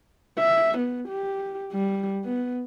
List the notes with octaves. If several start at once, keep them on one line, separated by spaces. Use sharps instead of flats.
E5
B3
G4
G3
B3